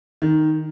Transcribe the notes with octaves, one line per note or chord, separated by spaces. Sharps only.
D#3